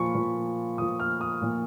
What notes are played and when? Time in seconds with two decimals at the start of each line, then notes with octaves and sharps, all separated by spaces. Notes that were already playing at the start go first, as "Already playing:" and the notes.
Already playing: A#2 F3 B5 C#6
0.14 A#2 F3
0.78 A#2 D#6
0.82 F3
1.00 F6
1.21 D#6
1.41 A#2 F3